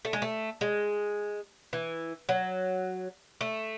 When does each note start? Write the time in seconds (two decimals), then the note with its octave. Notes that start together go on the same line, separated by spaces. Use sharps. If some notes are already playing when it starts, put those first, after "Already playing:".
0.05 A3
0.13 G#3
0.22 A3
0.61 G#3
1.73 E3
2.29 F#3
3.41 A3